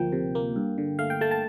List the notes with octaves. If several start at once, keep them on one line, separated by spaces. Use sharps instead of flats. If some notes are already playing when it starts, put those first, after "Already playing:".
Already playing: D2 F3 A#3 G5
C3
A#3
G2
D3
A3 F5
G5
A3 A5
A5